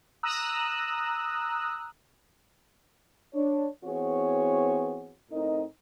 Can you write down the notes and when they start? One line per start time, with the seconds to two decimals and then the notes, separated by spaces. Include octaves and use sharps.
0.23 A#5 D#6 E6 F#6
3.34 D4 C#5
3.84 E3 B3 C4 F#4 G#4 C#5
5.31 A2 C4 D#4 A#4 D#5